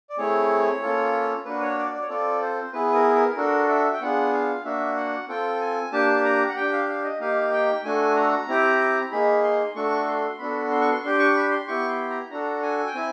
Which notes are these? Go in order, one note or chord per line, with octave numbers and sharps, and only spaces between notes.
D5
A3 C4 E4 G#4 C#5
A#3 C#4 F4 A4
A#3 D4 F#4 B4
C#5
D5
D5
C#5
C4 F4 A4 D5
C5
B3 E4 G#4 B4
A#4
A#4
D4 F#4 A4 A#4
E5
G5
B3 D4 F4 G#4 F#5
F5
A#3 D4 F#4 E5
F#5
C4 F4 A4 G5
G#5
A#3 D4 G4 A5
A#5
F#5
D4 G4 G5
F5
F5
D#5
A#3 D#4 G4 F5
G5
A3 D4 F#4 A4 G#5
A#5
C4 E4 G4
A#3 D#4 G#4 B5
C6
A3 D4 F#4 A4 C#6
C6
B3 D4 F#4 A4 B5
C6
C#6
C6
D4 G4 C6
C#6
B5
C6
B3 E4 G4 C#6
C6
A#5
D4 F#4 A4 A#5
G#5
G5
C4 E4 G#5